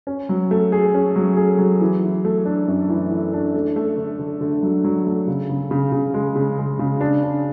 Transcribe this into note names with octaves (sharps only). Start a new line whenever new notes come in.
C#4
F#3
A3
G#4
C#4
F#3
G#4
F#3
E3
E3
A3
D4
F#2
E3
E3
D4
A3
A3
D3
D3
D3
F#3
F#3
A3
C#3
C#3
C#3
C#3
G#3
C#3
G#3
C#3
D4
D4